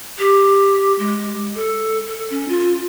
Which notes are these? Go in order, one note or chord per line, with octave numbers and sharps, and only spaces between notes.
G4
G#3
A4
A4
C#4
F4